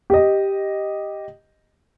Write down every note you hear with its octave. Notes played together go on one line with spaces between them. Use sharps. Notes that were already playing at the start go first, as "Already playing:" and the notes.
G4 D#5